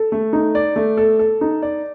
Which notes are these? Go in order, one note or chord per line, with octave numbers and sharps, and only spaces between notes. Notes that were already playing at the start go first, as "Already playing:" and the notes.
Already playing: A4
A3
D#4
D5
A3
A4
A4
D#4
D5